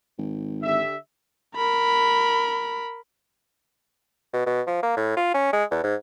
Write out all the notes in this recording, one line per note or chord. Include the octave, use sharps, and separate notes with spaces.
G#1
D3 G4 E5
A#4 B5
B2
B2
F3
A#3
A2
F4
C#4
G#3
E2
G#2